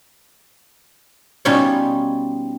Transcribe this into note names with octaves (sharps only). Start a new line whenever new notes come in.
B2 G3 C#4 D#4 F4 C#5